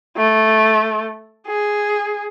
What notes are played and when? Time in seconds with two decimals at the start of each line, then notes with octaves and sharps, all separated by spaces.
0.17 A3
1.47 G#4